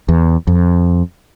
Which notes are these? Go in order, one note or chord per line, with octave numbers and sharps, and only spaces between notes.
E2
F2